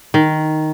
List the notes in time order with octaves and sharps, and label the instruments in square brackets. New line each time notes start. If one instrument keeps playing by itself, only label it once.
[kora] D#3